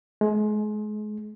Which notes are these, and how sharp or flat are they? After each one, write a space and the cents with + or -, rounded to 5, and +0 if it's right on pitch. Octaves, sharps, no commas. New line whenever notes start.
G#3 +35